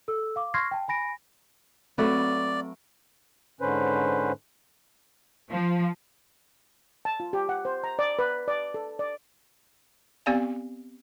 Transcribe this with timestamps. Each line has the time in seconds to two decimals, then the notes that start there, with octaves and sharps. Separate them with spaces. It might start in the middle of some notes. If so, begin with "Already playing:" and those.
0.08 A4 E6
0.36 F5 D6
0.54 C6 C#6 F6 G#6 A#6 C7
0.71 G5 A5
0.88 G#5 B5 A#6 D7
1.98 F#3 A3 C4 B4 D5
3.61 G#2 D3 C#4 B4 C5
5.51 F3
7.05 A5
7.20 F4
7.33 G4
7.49 F#5
7.65 C5
7.84 A#5
7.99 D5
8.19 B4
8.48 D5
8.74 A4
8.99 D5
10.26 B3 C4 G4 D5 F5 G#5